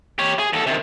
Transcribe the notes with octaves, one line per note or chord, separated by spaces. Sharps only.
G4 C#5
G#4
D#2 A4
C3 D#3